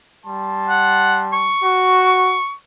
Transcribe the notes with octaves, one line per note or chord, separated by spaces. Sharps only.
G3 A5 C6
F#5
C#6
F#4